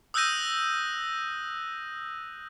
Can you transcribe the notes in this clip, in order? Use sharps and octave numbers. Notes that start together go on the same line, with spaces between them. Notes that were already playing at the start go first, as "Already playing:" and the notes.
D#6 E6 F#6 G6 A#6 D#7